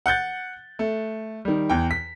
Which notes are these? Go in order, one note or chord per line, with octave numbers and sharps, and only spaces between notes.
F#5 F#6 G6 A6
A3
D#3 G3
E2 G5
B6